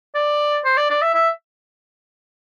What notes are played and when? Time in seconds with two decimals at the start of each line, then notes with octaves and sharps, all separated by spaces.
0.15 D5
0.65 C5
0.77 D5
0.90 D5
1.02 E5
1.14 E5